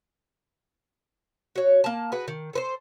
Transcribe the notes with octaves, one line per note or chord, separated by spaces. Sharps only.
F#4 C#5
A#3 A5
F#4 G#4 B4
D#3
A4 B4 C5